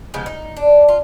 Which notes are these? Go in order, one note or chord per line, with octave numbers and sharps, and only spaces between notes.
C#3 F3 G#3 B3
D#4
D4
F4